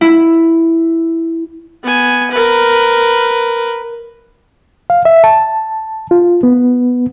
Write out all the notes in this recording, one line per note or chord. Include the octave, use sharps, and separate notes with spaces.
E4
B3 G#5
A#4 B4
F5
E5
A5
F4
B3